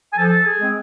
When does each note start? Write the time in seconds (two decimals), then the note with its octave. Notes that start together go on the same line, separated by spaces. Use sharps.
0.13 G#5
0.17 F3 A4 A5
0.45 G#4 G#5
0.59 G#3 C4